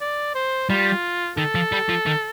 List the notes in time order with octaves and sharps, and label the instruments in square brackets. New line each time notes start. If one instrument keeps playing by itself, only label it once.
[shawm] D5
C5
[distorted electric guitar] G3 [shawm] F4
[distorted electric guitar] D#3 [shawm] A4
[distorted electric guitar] F3
G3
F3
D#3